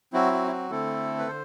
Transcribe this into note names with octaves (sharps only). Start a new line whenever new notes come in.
F#3 C4 E4 F#4
F#4
E4
F#4
D3 A3 C4 E4 A4
B4
D3 C5